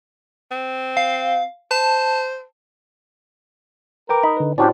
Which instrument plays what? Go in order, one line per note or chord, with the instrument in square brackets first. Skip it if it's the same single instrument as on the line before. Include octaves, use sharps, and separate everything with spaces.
[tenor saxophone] C4
[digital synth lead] F5
[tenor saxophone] C5 [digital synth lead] A5
[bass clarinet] A#4 [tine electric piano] B4 G5 D6
[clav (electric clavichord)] D#4 [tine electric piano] B5
[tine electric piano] D3 B4
[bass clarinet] A2 [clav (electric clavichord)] C#4 D4 G4 [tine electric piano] F#4 C5 D5